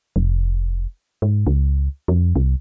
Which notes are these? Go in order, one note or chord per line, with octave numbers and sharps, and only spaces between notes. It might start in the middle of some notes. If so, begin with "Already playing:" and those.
F1
G#2
C#2
F2
C2